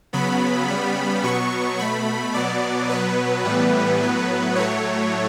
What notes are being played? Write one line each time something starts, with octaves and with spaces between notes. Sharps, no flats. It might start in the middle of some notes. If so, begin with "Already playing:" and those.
C#3 F#3 B3 B5
C#3 G3 B3
B2 F#3 B3 C#6
B2 A3 B5
B2 F#3 B3 D5
B2 F#3 B3 B4
A2 E3 G3 B3
A2 F#3 B3
A2 F#3 A3 C#5